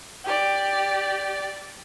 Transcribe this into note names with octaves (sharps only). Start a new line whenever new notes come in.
G4 D5